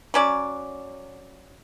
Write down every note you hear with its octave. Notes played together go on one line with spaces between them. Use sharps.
F#3 C#4 D5